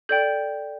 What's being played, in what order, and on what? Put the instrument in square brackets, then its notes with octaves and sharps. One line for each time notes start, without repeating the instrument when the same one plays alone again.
[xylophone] A4 D5 G5 G6